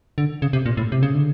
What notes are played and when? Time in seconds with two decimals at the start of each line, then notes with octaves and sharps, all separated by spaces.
0.18 D3
0.42 C#3
0.53 C3
0.66 A#2
0.77 A2
0.92 C3
1.03 C#3
1.14 D3